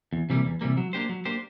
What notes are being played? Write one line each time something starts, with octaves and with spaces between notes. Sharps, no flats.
E2
C3 E3 G3 A#3
E2
C3 E3 G3 A#3
F#3
A#3 D4 G4 C5
F#3
A#3 D4 G4 C5